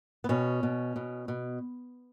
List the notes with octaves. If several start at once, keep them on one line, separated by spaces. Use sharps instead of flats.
B3
B2 C#4
B2
B2
B2